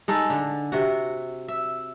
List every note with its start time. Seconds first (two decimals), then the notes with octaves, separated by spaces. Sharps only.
0.08 G#3 D#4 A4
0.30 D3
0.72 C3 F#4
1.48 E5